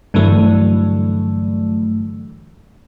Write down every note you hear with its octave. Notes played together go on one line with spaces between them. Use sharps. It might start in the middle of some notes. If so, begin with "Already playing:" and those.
G2 D3 E3 F#3 A3